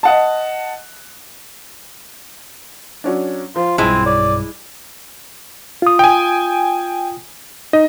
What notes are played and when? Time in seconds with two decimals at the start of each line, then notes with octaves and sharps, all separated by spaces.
0.03 D#5 F#5 A5
3.04 F#3 C#4 D4
3.56 F3 F4
3.78 B1 G2 G#3 C4 E4 G#5
4.06 C#5 D5
5.82 F4 D#6
5.99 G5 G#5
7.73 D#4 D#5